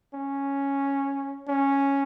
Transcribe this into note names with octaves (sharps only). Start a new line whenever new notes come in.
C#4
C#4